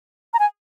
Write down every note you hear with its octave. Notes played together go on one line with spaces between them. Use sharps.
A#5
G#5